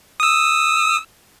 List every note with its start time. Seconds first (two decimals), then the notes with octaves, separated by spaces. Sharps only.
0.20 D#6 E6